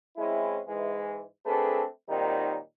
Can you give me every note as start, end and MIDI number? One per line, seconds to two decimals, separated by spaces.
0.17 0.58 56
0.17 0.58 60
0.17 0.58 61
0.17 0.58 64
0.67 1.21 44
0.67 1.21 52
0.67 1.21 56
1.45 1.84 57
1.45 1.84 60
1.45 1.84 62
1.45 1.84 68
1.45 1.84 69
1.45 1.84 71
2.09 2.56 46
2.09 2.56 51
2.09 2.56 54
2.09 2.56 55
2.09 2.56 60
2.09 2.56 63